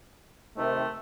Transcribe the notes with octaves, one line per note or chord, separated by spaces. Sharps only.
C3 D#3 A3